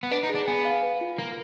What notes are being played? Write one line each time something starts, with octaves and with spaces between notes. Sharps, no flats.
B3
D4 B4
D#4
G#4
D4
B3 G#5
F5
B4
F4
A#3 F4